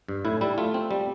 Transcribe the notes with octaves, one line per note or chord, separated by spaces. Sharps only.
G2
A2 E4
G3 E4
A3 F4
C4
G3